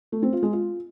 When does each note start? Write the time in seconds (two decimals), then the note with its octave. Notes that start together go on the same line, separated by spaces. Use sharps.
0.12 A3
0.22 C4
0.32 F4
0.43 G#3
0.53 F4